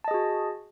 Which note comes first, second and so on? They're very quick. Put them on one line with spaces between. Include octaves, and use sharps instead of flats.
A5 D#5 G#4 F#4